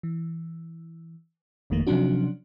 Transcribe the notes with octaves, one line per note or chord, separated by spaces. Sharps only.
E3
G1 F2 D#3 A3 A#3
C3 F3 F#3 C#4 D4 F#4